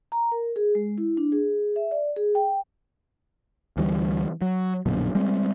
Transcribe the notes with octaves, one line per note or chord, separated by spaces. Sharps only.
A#5
A#4
G#4
G#3
E4
D4
G#4
E5
D5
G#4
G5
D2 E3 F3 G3
F#3
A#1 F#2 B2 D3
G3 G#3 C4